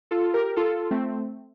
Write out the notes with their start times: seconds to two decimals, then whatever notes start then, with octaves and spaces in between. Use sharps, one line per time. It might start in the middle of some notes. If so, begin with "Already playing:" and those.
0.11 F4 A4
0.34 G4 A#4
0.56 F4 A4
0.91 A3 C4